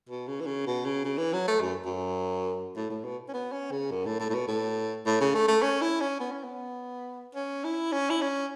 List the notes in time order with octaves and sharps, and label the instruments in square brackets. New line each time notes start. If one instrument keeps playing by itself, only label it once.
[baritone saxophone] B2
C#3
E3
C#3
B2
C#3
C#3
E3
F#3
A3
F#2
F#2
A2
A2
B2
C#4
B3
C#4
C#3
F#2
A2
A2
A2
B2
A2
A2
C#3
A3
A3
C#4
E4
C#4
B3
C#4
B3
C#4
E4
C#4
E4
C#4